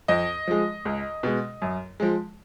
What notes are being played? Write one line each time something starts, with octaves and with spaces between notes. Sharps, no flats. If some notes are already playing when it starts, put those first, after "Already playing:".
F2 D#5
F3 G#3
C#2
B2 G#3
F#2
F3 G#3